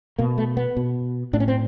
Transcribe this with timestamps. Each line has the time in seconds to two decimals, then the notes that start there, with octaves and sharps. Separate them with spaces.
0.19 B2 A#3
0.38 A3
0.57 B3
0.77 B2
1.33 A2 D4
1.40 C#4
1.48 C4